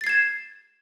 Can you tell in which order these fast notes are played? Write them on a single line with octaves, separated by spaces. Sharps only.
A6 C7 G#6 E7